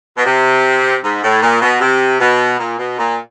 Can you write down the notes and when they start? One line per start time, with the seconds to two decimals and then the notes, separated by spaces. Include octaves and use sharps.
0.17 B2
0.25 C3
1.04 G#2
1.23 A2
1.42 A#2
1.62 B2
1.81 C3
2.20 B2
2.59 A#2
2.79 B2
2.99 A#2